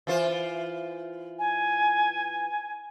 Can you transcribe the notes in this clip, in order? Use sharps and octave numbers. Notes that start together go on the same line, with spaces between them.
E3 F4 C5
G#5